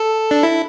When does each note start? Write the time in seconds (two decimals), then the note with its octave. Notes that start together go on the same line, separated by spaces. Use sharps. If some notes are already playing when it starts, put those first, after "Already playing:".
Already playing: A4
0.31 D4
0.43 E4